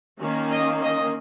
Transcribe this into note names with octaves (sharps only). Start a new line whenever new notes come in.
D#3 A#3 C#4
D#5
D#5